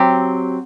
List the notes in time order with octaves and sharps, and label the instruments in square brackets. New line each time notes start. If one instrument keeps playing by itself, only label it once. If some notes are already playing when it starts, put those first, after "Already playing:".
Already playing: [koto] F#3 C4 G4